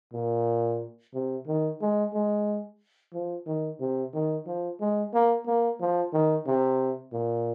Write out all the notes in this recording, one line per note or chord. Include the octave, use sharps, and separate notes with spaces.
A#2
C3
D#3
G#3
G#3
F3
D#3
C3
D#3
F3
G#3
A#3
A#3
F3
D#3
C3
A#2